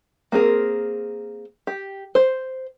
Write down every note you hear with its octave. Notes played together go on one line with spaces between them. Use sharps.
A#3 C4 G#4 A#4
G4
C5